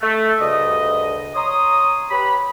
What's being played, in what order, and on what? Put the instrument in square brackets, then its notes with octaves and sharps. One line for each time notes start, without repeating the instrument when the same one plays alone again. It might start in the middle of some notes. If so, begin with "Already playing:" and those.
[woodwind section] A3
D2 G2 C#3 D#5
C#5 A#5 C6 D#6
G4 B4 C#5 B5